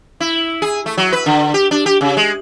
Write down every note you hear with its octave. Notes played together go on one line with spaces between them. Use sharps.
E4
G#4
A3
F#3
B4
D3
G4
D4
G4
C#3
G#3